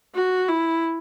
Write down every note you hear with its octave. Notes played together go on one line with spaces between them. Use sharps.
F#4
E4